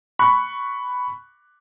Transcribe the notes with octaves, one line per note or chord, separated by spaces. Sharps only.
B5 C#6 F#6